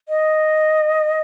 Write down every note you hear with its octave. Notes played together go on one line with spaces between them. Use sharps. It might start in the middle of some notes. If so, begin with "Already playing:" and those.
D#5